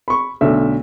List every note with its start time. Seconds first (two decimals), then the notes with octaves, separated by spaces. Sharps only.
0.08 B5 C#6
0.41 B1 D3 A3 E5